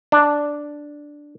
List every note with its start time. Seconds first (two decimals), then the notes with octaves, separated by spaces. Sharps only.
0.12 D4